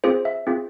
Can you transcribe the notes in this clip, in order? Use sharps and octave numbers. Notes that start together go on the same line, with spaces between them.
C4 F4 G#4 C5
E5
C4 F4 G#4